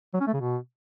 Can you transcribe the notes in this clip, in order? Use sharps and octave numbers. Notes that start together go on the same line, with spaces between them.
F#3
C#4
A3
C#3
B2